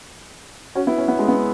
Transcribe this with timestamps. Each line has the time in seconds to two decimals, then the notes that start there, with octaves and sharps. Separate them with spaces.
0.75 C#4 F#4
0.87 B3 E4
0.98 C#4
1.08 B3
1.19 G#3
1.28 B3